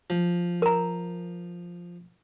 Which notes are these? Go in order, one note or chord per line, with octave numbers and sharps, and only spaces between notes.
F3
A#4 A#5